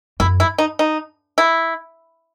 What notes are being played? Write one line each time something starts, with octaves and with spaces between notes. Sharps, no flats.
F#2 E4
E4
D#4
D#4
E4